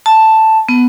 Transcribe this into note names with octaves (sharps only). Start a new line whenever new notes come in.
A5
B3